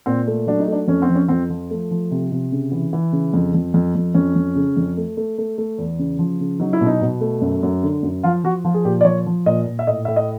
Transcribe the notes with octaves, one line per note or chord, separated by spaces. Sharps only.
A#2 C4
A3
F#3 D4
D#4
A3 D4
F2 C#4
C4
F3
C#4
F2 C4
F3
A3
F3
C3
C3
C#3
E3
E3
C#3
F2
F2
F2
F2
F2 C#4
F2
C#3
F2
A3
A3
A3
A3
E2
C#3
F3
C#3
F#3 D#4
E4
B2
D#4
B2
A3
F#2
F#2
D3
F#2
F3 F4
F3 F#4
F3 F4
G#4
A#2 G4
D5
F3 C#5
F3
A#2 D#5
A#2
E5
A2 D#5
A2 E5
D#5